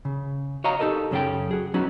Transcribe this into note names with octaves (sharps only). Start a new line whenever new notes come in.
C#3
F#4 C#5 D#5 F5 A#5
D#4 G4 A4 A#4 D#5
F#2 C#3 C#4 G4 A4 G5
F#4 G#4
F#3 B3 C#4 D#4 F#4